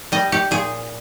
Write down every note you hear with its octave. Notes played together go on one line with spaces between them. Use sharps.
G3 D#5
G4
A#2 G#4